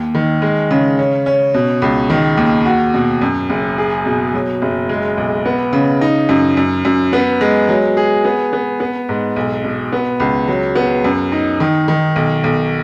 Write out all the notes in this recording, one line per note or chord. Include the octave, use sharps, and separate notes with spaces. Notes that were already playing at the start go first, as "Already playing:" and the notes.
Already playing: D#2
D#3
G#3
C#3
C#4
C#4
B2
C#2
D#3
D#2
F#4
B2
F#2
F#1
G#4
B2
F#3
F#1
G#3
B1
B3
C#3
D#4
F#2
F#2
F#2
B3
G#3
F#3
G#4
B3
B3
B3
G#2
B1
B2
B3
C#2
F#3
B3
F#2
D#4
D#3
D#3
B1
B1